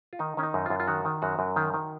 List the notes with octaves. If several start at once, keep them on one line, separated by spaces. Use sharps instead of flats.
F4
D#3 D#4
D#3 C#4
D#4
F#2
F#2 F4
F4
D#3 F#4
D#3
F#2 F#4
F#2
D#3
D#3